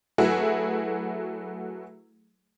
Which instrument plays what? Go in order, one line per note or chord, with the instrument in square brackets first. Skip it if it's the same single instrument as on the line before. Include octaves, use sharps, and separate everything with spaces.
[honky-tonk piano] F#3 A3 E4 F#4 G#4 B4